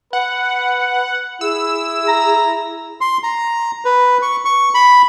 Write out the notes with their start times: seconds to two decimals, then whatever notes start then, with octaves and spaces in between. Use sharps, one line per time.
0.13 B4 F#5
1.41 E4 G#4 E6
2.08 A#5
3.01 C6
3.23 A#5
3.85 B4
4.22 C#6
4.45 C#6
4.74 B5